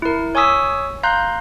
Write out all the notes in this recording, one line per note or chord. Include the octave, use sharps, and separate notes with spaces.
E4 A#4
C#5 G#5 C#6 D#6 E6 B6
F5 A#5 C6 F#6 G6